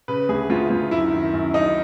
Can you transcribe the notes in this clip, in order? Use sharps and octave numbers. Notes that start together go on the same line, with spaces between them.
C#3 B4
D2 G#4
D2 F4
D2
F#2 E4
D#3
F#2
F#2 D#4